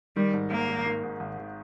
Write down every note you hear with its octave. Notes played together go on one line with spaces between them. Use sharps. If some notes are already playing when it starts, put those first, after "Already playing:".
D#3 G3
G#2
G#1 A#3
G#1
D#3
G#2
G#1
G#1